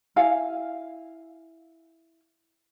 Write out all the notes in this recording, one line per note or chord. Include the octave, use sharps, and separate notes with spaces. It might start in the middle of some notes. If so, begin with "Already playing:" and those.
E4 F5 G#5